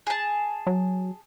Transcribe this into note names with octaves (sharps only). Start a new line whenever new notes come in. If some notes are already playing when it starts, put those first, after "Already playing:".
G#4 A5
F#3